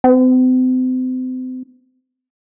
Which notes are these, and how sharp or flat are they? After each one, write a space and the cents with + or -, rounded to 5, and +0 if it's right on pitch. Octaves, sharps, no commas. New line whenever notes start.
C4 -40